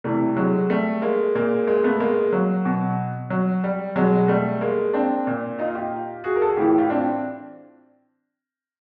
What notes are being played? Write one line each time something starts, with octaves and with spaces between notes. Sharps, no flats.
C3 E3 G3 A3
F#3 G#3
G3 A3
G#3 A#3
A#2 G#3 A#3
G#3 A#3
A3 B3
G#3 A#3
F#3
B2
F#3
G3
B2 F#3 G#3
G3 A3
G#3 A#3
C4 D4
A#2
D#4 F4
F4 G4
F#4 G#4
A#4
A4
G#4
A2 E3 F4 G4
F4 G4
C4 D4